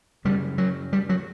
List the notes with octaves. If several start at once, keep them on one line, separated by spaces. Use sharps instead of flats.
F#2 C#3 G3
F#3
G3
F#3